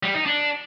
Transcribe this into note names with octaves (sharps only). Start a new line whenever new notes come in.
G3
D#4
D4